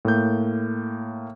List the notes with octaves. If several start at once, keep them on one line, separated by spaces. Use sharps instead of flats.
A2 A#3 G6